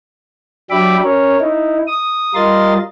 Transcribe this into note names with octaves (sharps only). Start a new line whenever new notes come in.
F#3 D4 G4 E5 B5 D6
C#4 A#4 C#5
D#4 E4
D#6
G3 F4 A#4 D#5 C6 A6